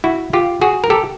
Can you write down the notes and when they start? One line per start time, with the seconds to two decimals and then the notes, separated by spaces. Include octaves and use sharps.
0.04 E4 F#4
0.33 F4 G4
0.61 F#4 G#4
0.84 A#4
0.90 G4 A4